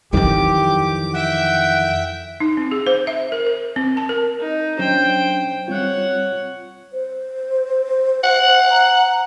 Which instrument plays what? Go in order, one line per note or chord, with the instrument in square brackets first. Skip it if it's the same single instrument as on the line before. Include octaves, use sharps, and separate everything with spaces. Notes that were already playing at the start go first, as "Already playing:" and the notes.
[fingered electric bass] F2 D#3 E3 [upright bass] F#3 D#4 [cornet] G4 [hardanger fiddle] D6
[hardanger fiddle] E5 G5 [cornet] F#5
[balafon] D#4
C4
G#4
C5
E5
A#4
A#4
C4
A5
A#4
[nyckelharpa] D#4
[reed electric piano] F#3 C#4 D4 [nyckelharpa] C5 G5
[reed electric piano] G3 C4 F4 [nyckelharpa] C#5 F#5
[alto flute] C5
[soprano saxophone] F#5
[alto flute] A#5